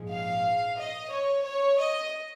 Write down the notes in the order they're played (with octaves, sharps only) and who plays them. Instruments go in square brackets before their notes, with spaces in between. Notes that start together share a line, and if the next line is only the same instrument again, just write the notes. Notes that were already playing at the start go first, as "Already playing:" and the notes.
Already playing: [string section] A#1 G#2 F3 G#3
F5
D#5
C#5
C#5
D#5